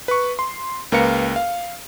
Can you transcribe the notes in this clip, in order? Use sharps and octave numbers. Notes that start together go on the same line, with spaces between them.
B4 C#6
C6
C#2 A#3 A#4 B4 F5 C#7
F5